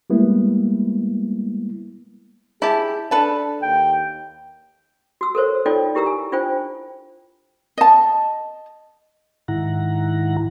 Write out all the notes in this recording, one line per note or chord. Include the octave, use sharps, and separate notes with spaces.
G3 G#3 A#3 B3 E4
E4 G4 G#4 A5
D4 A4 B4 A5
D#2 G5
F#4 E6
A4 A#4 C5 C#5
D#4 F4 A4 C#5 D5 G5
E4 G4 A#4 A#5 E6
G#5
D4 F4 C5 G5
D#5 A5
G#2 D#3 E4 F#5 A#5